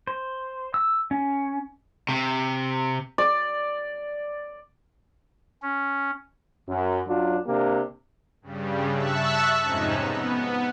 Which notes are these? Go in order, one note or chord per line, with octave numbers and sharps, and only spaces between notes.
C5
E6
C#4
C3
D5
C#4
F#2
F#2 F#3 D4 F4
C3 A#3 D4 G4
G2 C#3 G3
E5 A5 C#6 E6 F#6
F2 G#2 C3 C#4 D#4
B3